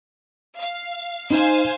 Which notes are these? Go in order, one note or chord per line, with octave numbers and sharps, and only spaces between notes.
F5
D#4 C5 F5 G#5